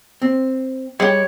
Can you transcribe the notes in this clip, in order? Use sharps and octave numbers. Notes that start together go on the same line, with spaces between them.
C4
G3 G#3 G4 C#5